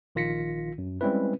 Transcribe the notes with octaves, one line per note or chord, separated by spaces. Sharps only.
A#1 D#3 F4 A#6 B6 C#7
F#2
G3 G#3 C4 C#4 E4 B4